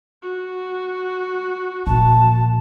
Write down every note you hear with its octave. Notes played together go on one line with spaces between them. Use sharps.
F#4
A#2 F3 A5